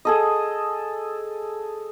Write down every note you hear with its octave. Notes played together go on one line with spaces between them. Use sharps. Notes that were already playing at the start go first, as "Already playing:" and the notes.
G#4 A4 D#5